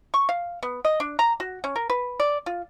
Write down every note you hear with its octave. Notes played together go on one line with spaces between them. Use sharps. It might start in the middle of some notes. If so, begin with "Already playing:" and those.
C#6
F5
B3
D#5
D4
A#5
F#4
C#4
A#4
B4
D5
F4